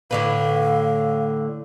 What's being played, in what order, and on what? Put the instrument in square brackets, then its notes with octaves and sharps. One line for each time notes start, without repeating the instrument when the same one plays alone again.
[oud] A2 D3 B4 [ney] F5